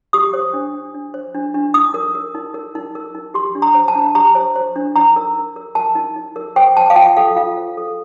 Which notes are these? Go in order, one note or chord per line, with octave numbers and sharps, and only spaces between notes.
G4 D#6
C5
D4
D4
D4
C5
D4
D4
D#4 D#6
A#4
A#4
D#4
A#4
D#4
A#4
D#4
G4 C6
D4
A#5
C5
A5
D4
G4 A#5
C5
C5
D4
D#4 A#5
A#4
D#4
A#4
A#4 A5
D#4
D#4
A#4
C5 G5
C5 A5
F5
F4 G5
A4 F5
F4 F5
C5
A4